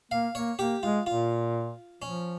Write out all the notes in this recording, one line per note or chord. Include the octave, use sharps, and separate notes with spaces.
A#3 F5
A#3 C#5
A#3 G4
G#3 F4
A#2 F4
F3 C#4